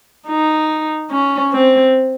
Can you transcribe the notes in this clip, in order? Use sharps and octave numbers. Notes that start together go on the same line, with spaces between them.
D#4
C#4
C4